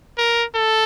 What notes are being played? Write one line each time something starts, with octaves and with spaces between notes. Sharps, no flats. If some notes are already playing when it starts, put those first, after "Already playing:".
A#4
A4